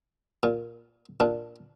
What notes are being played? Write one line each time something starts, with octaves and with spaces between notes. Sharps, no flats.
A#2
A#2 D4